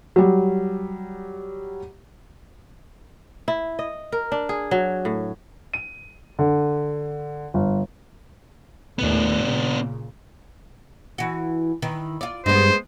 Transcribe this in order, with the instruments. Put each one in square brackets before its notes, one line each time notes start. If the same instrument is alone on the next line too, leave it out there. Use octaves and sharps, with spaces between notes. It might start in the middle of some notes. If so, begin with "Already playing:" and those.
[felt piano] F#3 G3
[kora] E4
D#5
A#4
D4
G#4
F#3
A2
[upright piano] D#7
D3
G1
[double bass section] D#2 A2 [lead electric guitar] B3 D4
[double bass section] A#2 C#3
[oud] E3 F#4
D#3 E3
F4 D5
[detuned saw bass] G2 [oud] G#3 B3 [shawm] C5